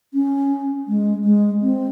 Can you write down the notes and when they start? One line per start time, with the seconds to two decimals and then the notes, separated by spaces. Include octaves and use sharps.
0.14 C#4
0.88 G#3
1.24 G#3
1.61 C4